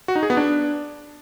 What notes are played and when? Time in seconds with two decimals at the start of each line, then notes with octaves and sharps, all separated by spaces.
0.08 F#4
0.16 D#4
0.23 G#4
0.30 B3
0.37 D4